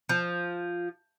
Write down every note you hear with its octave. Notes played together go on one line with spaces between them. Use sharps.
F3